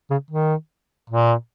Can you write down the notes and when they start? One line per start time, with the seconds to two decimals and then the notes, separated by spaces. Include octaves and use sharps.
0.10 C#3
0.30 D#3
1.09 A#2